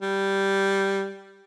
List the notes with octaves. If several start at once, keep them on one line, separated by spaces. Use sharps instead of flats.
G3